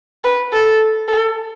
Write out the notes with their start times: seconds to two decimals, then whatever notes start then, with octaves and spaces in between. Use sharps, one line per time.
0.24 B4
0.52 A4
1.08 A4